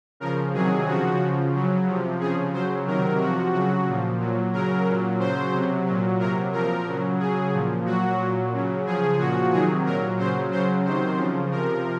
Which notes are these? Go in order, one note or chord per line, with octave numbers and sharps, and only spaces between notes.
C#3 F3 A#4
C3 D#3 F#3 G#4
C#3 F3 F#4
C#3 F3
C#3 F#3
C3 F3
C#3 F3 G#4
C#3 F#3 C5
C3 D#3 F#3 A#4
C3 F3 F#4
C#3 F#3 F#4
A#2 F3
A#2 F#3
C#3 F#3 A#4
A#2 F#3
C#3 F#3 C5
C3 F#3
A#2 F#3
C3 F#3 A#4
A#2 F3 A#4
C#3 F#3
C#3 F#3 G#4
A#2 F3
A#2 F#3 F#4
A#2 F#3
C#3 F#3
C#3 F3 G#4
A#2 F3 F#4
C3 D#3 F#3 G#4
A#2 F#3 A#4
C#3 F#3 C5
C#3 F#3 C5
C3 D#3 F#3 C5
C#3 F3
C3 F3 A#4